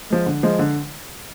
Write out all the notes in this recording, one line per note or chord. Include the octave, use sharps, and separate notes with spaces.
F3 G#3
D3
F3 G#3
D3